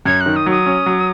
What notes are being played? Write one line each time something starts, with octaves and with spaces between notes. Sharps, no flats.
F#2 G#6
F#6
D#3
D#6
F#3 D#6
C#4
F#3